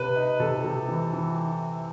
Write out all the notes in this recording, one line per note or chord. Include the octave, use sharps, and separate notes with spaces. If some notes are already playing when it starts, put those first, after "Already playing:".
Already playing: C3 B4
D#4
C3 A4
C3
E3
E3